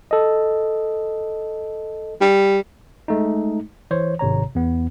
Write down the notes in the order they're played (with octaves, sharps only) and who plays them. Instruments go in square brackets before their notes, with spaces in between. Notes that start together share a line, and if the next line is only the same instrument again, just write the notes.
[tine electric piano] A4 D#5
[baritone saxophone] G3
[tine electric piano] G#3 A3 D#4
E3 C5 C#5
G#1 C3 C#5 A#5
E2 B3